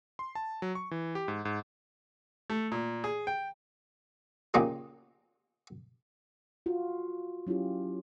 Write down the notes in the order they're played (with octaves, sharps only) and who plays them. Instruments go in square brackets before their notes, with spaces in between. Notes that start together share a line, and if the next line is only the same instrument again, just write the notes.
[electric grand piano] C6
A5
F#3
C#6
E3
G4
G#2
G#2
[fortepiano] A3
A#2
G#4
G5
[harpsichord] A#2 C#3 A#3 D#4 G4 G#4
[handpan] F4 F#4
F#3 C#4 E4 F4 G4